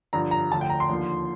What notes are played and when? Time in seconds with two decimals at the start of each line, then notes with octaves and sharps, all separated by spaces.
0.13 G2 D3 F3 A#5
0.31 A#5
0.50 D2 D3 F3 A5
0.61 G5
0.70 A#5
0.80 C6
0.89 D#2 D3 F3